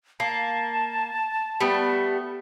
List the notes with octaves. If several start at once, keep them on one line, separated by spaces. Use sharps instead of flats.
A#3 A5
G3 A3 B3